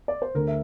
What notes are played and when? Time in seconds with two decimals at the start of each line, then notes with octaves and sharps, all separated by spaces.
0.08 D5
0.22 C5
0.34 D2 D3 A#4
0.48 E5